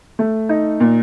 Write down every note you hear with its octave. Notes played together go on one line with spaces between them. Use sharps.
A3
D#4
A#2